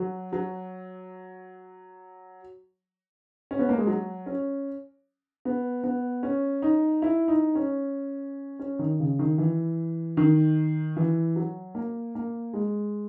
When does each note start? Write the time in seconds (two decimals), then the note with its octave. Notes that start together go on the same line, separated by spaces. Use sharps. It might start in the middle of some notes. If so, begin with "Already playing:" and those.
Already playing: F#3
0.33 F#3
3.51 C#4
3.59 B3
3.69 A#3
3.78 G#3
3.87 F#3
4.26 C#4
5.45 B3
5.84 B3
6.23 C#4
6.62 D#4
7.02 E4
7.28 D#4
7.55 C#4
8.59 C#4
8.79 D#3
9.00 C#3
9.19 D#3
9.38 E3
10.17 D#3
10.97 E3
11.36 F#3
11.75 A#3
12.15 A#3
12.53 G#3